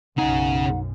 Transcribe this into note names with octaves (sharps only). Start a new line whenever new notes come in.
B1 F#2 C#3 D#4 F#5 G#5